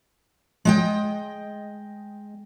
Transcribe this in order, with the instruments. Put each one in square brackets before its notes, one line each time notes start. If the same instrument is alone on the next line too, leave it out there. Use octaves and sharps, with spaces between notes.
[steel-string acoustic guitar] G#3 D#5 G5